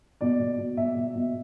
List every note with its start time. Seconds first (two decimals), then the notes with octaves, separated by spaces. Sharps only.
0.21 B2 D5
0.40 B2
0.58 B2
0.77 B2 E5
0.96 B2
1.15 B2